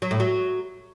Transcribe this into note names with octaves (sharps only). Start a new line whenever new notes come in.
F#3
A2
F#3